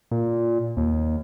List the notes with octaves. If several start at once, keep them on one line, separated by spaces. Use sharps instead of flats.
A#2
D#2